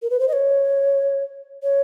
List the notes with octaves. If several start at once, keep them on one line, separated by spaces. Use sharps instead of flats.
A#4
B4
C5
D#5
C#5
C#5